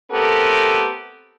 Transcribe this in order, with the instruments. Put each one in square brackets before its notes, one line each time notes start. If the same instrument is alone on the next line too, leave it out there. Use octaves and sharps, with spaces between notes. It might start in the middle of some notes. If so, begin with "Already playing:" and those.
[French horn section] A3 B3 C4 G4 A4 A#4